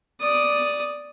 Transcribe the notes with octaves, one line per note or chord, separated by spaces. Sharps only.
D5 D#6